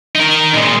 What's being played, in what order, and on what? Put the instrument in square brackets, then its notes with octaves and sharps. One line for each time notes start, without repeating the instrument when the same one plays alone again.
[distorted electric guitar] D#4 A#4
A#2 G#3